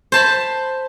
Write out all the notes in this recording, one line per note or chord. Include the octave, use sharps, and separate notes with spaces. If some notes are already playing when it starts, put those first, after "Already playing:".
C5 A5 B5